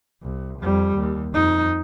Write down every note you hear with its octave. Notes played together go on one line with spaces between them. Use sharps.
C2
F2 G3
D#2
F2 D#4